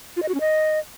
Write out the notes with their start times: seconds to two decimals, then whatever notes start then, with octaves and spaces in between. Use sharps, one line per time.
0.16 F4
0.22 D#5
0.28 F#4
0.34 C#4
0.40 D#5